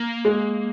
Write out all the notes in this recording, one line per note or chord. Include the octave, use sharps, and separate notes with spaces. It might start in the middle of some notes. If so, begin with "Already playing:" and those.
Already playing: A#3
G#3